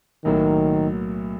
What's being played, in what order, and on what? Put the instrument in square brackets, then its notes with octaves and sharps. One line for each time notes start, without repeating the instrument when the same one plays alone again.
[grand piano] B1 A2 F#3 A#3 [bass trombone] D#3